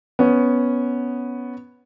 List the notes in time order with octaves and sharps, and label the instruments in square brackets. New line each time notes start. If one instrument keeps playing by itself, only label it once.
[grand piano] B3 C#4